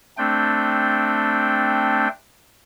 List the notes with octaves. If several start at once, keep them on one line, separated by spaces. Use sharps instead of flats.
A3 C4 D4 G5